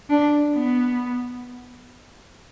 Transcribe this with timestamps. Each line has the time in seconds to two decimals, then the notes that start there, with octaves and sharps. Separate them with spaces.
0.10 D4
0.55 B3